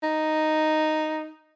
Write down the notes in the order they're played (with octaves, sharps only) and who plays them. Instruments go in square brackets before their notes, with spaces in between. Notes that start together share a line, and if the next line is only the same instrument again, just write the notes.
[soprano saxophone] D#4